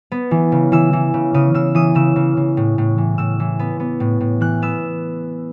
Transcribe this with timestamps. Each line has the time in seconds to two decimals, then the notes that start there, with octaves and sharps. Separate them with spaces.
0.12 B3
0.31 E3
0.52 C#3
0.72 E3 E6
0.93 E3
1.14 C#3
1.34 C#3 D#6
1.54 C#3 E6
1.75 E3 D#6
1.95 C#3 E6
2.16 C#3
2.37 C#3
2.57 A2
2.78 A2
2.98 E3
3.18 A2 E6
3.40 E3
3.59 B3
3.80 B3
4.00 A2
4.21 A2
4.41 E3 F#6
4.62 B3 E6